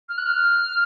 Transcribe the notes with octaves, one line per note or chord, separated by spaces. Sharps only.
F6
F#6
F6